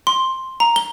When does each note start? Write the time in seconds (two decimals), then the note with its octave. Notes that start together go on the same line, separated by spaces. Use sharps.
0.07 C6
0.60 A#5
0.76 G7